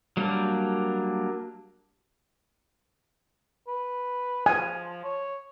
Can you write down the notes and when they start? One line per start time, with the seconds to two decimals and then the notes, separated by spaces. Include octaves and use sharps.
0.17 F#3 G3 A#3 D4
3.67 B4
4.46 F3 G#5
5.04 C#5